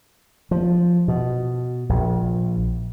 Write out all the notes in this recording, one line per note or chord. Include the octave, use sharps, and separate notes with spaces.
F3
B2
A#1